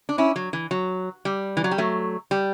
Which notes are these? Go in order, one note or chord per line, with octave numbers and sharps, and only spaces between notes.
D4
C#4 E4
F#3
E3
F#3
G3
E3
F#3
G3
F#3 A3
G3